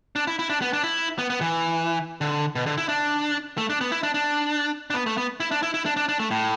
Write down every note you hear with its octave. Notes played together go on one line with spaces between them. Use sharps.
D4
E4
E4
D4
B3
D4
E4
B3
B3
E3
D3
B2
D3
E4
D4
A3
D4
B3
E4
D4
D4
D4
B3
A3
B3
E4
D4
E4
E4
D4
D4
D4
A3
A2